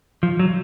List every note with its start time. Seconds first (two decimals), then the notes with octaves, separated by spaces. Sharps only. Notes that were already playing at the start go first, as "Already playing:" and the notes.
0.23 F3
0.39 F#3